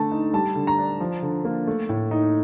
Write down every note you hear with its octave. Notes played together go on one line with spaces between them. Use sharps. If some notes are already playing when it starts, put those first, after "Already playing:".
Already playing: D3 A3 A5
D#4
G3 A5
D3
A#5
D4
F3
D3
A#3
A3
A2
D#4